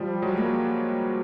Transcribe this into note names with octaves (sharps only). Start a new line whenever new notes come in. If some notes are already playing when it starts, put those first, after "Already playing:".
Already playing: F3 G3
F#3 G#3
G#3 A#3